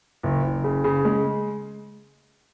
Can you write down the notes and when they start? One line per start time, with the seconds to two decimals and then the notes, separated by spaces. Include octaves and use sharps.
0.23 F#1
0.43 F#1
0.64 C#3
0.84 C#3
1.05 G#3